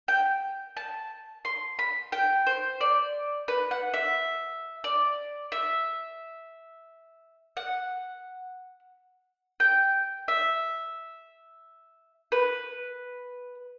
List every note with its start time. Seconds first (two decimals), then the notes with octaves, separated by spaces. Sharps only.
0.08 G5
0.77 A5
1.45 C6
1.79 B5
2.12 G5
2.46 C5
2.81 D5
3.48 B4
3.71 F#5
3.94 E5
4.84 D5
5.52 E5
7.57 F#5
9.60 G5
10.28 E5
12.32 B4